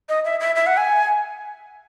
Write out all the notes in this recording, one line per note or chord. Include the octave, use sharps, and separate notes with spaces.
D#5
E5
E5
E5
F#5
G#5